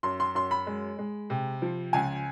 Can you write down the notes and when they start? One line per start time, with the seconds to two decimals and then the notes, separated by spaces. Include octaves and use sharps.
0.03 F#2 C6
0.20 C6
0.35 F#2 C6
0.51 B5
0.67 G#3
0.99 G#3
1.30 C3
1.62 F3
1.93 C#2 G#5